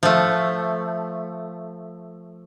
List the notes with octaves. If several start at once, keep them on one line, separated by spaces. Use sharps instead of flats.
F3 A3